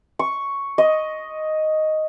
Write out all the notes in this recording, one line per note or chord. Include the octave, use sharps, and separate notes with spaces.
C#6
D#5